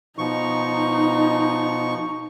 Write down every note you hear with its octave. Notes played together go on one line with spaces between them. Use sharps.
B2 F3 D#4 C#6